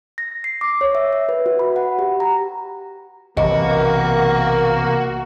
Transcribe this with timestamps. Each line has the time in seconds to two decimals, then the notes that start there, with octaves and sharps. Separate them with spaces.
0.18 A#6
0.44 C7
0.61 D6
0.81 C#5
0.95 E5
1.13 E5
1.29 B4
1.46 F#4
1.59 B5
1.76 F#5
1.99 G4
2.20 A#5
3.37 B1 C3 E3 A#3 F#4 D#5